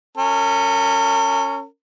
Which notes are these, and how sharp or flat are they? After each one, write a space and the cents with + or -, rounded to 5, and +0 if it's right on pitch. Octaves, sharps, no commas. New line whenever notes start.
C#4 +0 A#4 -45